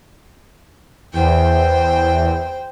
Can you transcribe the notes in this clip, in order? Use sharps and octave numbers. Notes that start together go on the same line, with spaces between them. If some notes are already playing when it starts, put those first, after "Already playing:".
E2 C5 G5